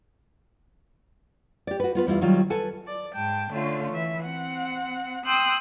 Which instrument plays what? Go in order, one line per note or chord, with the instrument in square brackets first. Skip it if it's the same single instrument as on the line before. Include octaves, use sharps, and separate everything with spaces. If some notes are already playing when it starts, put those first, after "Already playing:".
[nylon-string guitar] G4 D5
F#4 B4
B3 F4 B4
E2 G3 E4 F4
D#3 F#3 G3 F4
A4 B4 G#5 A5
[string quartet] D5
G#2 G5 A5
D3 A3 C#4 F4
E3 E5
C4 F#5
G5 C6 D#6 E6 F#6